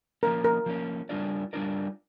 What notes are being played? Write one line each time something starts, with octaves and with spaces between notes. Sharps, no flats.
F3 A#3 C#4 A#4
A#4
F3 A#3 C#4
G3 D4 F4 A#4 D5
G3 D4 F4 A#4 D5